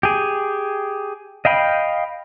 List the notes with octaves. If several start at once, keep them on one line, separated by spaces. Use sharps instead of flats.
G4 G#4
D#5 F5 G5 B5